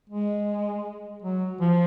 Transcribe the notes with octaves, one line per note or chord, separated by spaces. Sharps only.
G#3
F#3
F3